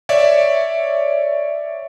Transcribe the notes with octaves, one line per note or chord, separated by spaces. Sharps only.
C#5 D5 E5